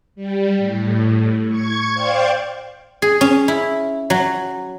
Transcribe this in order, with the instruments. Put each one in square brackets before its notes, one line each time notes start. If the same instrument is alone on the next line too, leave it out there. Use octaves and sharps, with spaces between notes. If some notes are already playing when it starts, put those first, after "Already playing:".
[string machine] G3
A2
C#6 G#6
C5 D5 F5 G5
[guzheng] G#4
C#4
E4
F#3